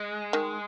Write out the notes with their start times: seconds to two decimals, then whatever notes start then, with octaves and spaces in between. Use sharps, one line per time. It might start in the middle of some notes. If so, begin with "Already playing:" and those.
Already playing: G#3
0.33 D#3